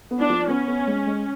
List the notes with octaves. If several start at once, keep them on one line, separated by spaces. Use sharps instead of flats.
B3
D4
F3
B3 C#4
B3
G#3
G#3